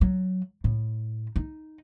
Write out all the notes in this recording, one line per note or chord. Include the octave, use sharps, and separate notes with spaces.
F#3
A2
D#4